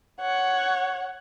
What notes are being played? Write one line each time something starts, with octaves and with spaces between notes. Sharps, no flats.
C#5 F#5